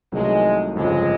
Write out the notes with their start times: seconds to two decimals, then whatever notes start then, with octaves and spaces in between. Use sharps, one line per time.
0.12 C2 C3 D#3 F#3 G#3 A3
0.75 G1 F2 C#3 G#3